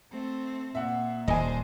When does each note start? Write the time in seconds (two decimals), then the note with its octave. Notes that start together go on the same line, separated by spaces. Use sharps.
0.12 A3 C4
0.75 A#2 E5 F#5
1.28 D#1 D4 C5 D#5 G#5